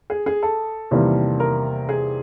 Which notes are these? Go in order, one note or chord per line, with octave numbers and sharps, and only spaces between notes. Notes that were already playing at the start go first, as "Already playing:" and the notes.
G#4
G#4
A4
E2 C3 D#3 G3 A#3
A#4
G#4